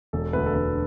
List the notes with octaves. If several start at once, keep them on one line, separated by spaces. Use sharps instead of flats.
E1 A4
D2 D3 B4
A4
E1 B4